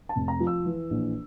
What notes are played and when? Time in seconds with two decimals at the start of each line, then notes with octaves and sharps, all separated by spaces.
0.09 A5
0.16 F1
0.28 A#5
0.40 F3
0.47 E6
0.65 E3
0.90 A#1